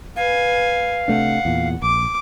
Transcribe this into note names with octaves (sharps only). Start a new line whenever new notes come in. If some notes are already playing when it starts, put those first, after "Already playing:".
B4 F5 G#5
C3 A3 D4 F#5
E2 A#2
A#1 D6